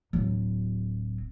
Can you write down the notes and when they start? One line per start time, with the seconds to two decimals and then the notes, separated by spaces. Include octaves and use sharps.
0.13 D1 F#3